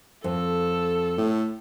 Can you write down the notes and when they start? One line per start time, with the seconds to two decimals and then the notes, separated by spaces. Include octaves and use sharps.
0.24 F2 A4
1.18 A2